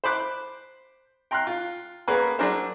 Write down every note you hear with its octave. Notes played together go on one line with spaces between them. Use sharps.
C5 B5 D6 F#6
G5 A#5 C6 F6 F#6
F4
A#3 B3 C#4 G#4 A#4 B4
F#3 D4 G#4 A#4 C5